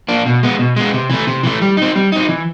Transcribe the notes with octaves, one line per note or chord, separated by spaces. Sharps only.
A#3 D4
B2
G#3 B3
B2
G#3 B3
C3
E3 A3
C3
E3 A3
G3
C4 D#4
G3
C4 D#4
E3